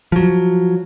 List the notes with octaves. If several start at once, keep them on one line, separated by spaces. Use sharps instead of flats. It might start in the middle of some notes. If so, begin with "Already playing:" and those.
F3 F#3